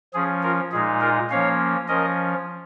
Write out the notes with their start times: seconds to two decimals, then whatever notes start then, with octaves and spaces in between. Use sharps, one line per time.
0.14 F3 C#4 G#4
0.43 F4 A#4
0.72 A#2 G#3 D#4 G#4
1.01 F4 A#4
1.30 F3 A#3 C#4 C#5 F5
1.88 F3 C#4 A#4 D#5